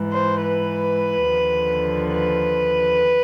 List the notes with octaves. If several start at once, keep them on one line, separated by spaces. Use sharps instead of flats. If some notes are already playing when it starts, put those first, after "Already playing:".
Already playing: G#2 E3
C5
B4
D#2 D3 F3
B4